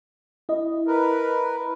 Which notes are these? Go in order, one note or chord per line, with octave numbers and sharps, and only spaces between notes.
E4 D#5
A#4 B4